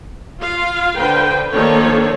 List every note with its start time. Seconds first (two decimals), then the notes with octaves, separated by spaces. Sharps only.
0.41 F4 F5
0.98 D3 B4 C5 G5
1.53 D#3 F3 A#3 D4 A4 C#5